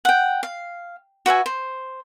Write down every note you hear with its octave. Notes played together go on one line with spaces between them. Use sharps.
F#5 G5
F5
F#4 B4 E5 G#5
C5